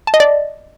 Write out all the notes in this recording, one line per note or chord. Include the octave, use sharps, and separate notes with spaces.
A5
D#5
D5